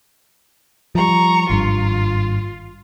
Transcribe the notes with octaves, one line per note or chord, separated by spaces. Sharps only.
F3 G3 A#5 C#6
G#1 G2 F4